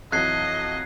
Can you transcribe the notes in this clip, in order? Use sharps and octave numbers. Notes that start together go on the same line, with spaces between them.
F2 E3 F#3 D#5 F#6 G#6 C7